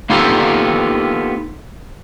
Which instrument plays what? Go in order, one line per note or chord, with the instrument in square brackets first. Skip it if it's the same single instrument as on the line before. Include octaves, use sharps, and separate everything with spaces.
[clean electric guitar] A#3 B3 D#4 F4 G4 A4